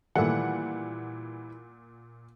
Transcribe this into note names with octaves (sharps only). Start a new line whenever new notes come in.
A#2 D#3 E3 G3 A3 A4 F#5